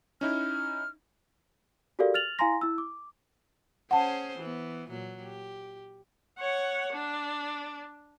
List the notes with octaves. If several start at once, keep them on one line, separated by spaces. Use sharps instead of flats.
C#4 D#4 E4 F6
F#4 G4 A4 A#4 D5 F5
F6 A6 F7 F#7
E4 F5 G#5 A#5 C6 A#6
E4 E6
D6
C#4 G#4 C5 F#5 A5
E3 B3
A#2 F#3
G4
C#5 F#5
D4